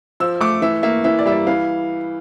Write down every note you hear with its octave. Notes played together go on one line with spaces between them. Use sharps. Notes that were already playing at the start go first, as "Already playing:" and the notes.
F3 E6
A3 D6
E3 E5
A#3 E5
E3 E5
D5
G3 E5
D5
E3 F5